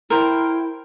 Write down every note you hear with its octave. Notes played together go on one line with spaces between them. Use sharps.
E4 A#4 C5 G5